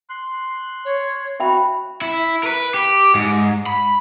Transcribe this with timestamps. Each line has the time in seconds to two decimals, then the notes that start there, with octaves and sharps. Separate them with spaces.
0.10 C6 F#6
0.85 C#5
1.40 F#4 E5 G5 B5
2.02 E4
2.43 A#4 B4
2.74 G4
3.15 G#2
3.66 B5